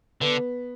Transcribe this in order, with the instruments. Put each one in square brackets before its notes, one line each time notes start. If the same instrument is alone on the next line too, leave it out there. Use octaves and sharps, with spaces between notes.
[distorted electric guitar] D3 [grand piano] B3